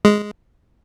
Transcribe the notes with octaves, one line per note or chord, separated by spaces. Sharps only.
G#3